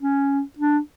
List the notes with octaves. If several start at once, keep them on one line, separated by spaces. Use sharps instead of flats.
C#4
D4